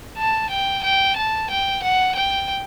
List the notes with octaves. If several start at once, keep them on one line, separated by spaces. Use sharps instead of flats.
A5
G5
G5
A5
G5
F#5
G5